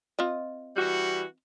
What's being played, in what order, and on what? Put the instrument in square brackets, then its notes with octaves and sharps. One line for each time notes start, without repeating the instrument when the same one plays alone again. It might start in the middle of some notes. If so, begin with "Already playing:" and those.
[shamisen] C4 F4 D#5
[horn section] E3 G3 F#4